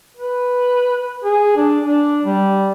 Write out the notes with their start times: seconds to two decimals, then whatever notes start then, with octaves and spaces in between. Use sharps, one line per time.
0.17 B4
1.24 G#4
1.56 D4
1.84 D4
2.25 G3